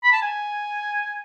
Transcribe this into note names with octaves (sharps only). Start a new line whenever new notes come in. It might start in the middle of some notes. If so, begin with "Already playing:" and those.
B5
A5
G#5